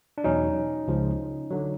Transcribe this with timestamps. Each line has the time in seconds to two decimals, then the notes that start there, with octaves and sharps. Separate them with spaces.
0.18 D4
0.24 E2 B2 F#3 C#4 D#4
0.88 C#2 C#3 F3
1.51 D3 F#3